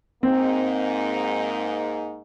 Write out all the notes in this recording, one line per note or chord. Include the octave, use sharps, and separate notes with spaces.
G#2 A#3 C4 D#4